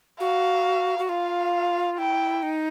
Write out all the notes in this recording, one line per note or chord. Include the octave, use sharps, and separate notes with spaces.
F#4 F5
F#4
F4 F5
E4 G5
D#4